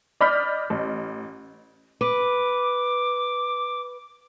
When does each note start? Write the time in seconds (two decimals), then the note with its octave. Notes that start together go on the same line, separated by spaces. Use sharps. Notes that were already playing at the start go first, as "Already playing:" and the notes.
0.21 D5 D#5 B5 F6 G6 B6
0.70 A1
2.01 B4 D6